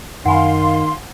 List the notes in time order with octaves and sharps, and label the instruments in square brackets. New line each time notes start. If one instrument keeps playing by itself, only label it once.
[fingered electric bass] F#2 C4 [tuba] D#3 [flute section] F5 C6 [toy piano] F#5 G#5 B5